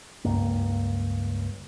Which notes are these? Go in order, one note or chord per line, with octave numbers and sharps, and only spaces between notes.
C#2 G2 A#3